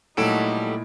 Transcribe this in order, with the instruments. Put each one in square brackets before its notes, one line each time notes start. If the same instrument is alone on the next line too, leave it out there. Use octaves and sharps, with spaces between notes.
[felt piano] A#2 E4 D7 [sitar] F#3 G3 A4 [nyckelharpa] A3 D#4